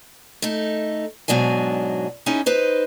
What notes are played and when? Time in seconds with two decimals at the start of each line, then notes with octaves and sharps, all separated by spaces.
0.42 A3 D#4
1.28 G#2 B2 F#3 D4 G#5
2.26 C#4 D#4 E4 G#4
2.46 D#4 B4 C5